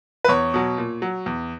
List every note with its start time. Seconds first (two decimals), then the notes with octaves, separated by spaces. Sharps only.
0.25 B4
0.29 E2 C#5
0.54 B2 F#3
0.78 A#2
1.02 F#3
1.26 E2